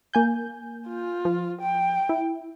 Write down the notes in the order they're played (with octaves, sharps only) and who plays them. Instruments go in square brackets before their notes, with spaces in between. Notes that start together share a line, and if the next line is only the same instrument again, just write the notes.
[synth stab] A#3 G#5 G6
[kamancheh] F4
[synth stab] F3
[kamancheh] G5
[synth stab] E4